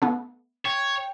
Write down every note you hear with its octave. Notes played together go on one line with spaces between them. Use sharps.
A3 B3
C#5 G5